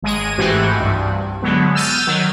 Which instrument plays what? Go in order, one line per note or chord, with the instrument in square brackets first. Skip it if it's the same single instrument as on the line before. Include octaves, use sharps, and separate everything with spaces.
[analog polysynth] G#1 G#3 G#4 D#7
G#2 E3 A3 C4 F#4 G4
C2 G2
D3 F#3 G#3 B3
E6 F6 G6 A6 D#7
D#3 F#3